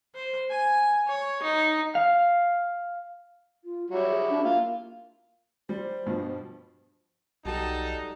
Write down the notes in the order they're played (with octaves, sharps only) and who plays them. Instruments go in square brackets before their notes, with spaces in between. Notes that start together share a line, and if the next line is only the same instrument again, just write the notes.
[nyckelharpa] C5
G#5
C#5
D#4
[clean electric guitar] F5
[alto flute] F4
[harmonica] F#3 G3 E4 [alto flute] C#5
[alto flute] G#4
D4
[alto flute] A#3 [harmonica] F4
[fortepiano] G3 [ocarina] C5
[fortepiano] G2 B2 F3
[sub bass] B1 [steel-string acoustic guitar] G3 F#4 A4 [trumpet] D#4 [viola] A5